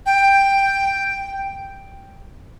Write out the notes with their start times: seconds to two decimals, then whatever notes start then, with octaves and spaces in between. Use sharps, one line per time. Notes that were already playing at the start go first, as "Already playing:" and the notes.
0.06 G5